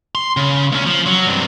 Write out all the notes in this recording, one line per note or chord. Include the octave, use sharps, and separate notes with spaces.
C6
C#3
D2 C#4
F3
F#3
G2 C3